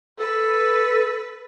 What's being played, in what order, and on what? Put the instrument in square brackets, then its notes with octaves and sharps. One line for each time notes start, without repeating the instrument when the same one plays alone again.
[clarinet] A4 [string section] B4